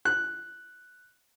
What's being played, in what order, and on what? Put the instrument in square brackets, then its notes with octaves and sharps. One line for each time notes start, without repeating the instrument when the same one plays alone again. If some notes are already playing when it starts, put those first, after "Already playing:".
[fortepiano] F#6